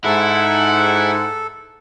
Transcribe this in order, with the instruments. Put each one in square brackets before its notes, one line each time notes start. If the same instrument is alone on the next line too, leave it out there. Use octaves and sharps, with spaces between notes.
[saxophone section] G#2 [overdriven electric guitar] E4 [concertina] A4 [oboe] F#5